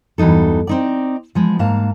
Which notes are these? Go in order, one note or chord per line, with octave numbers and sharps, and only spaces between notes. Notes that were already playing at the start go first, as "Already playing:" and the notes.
E2 G2 F#3 D#4 A4
C4 D#4 D5
F3 G#3 B3
G#2 A#3 F5 A5